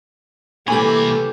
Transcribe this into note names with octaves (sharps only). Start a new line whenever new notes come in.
C2 E3 A3 A#3 G4 C#5 G#5 B5